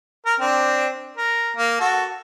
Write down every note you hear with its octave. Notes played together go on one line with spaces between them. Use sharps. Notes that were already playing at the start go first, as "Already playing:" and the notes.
A#4
C4 D4
A#4
A#3
F#4 A4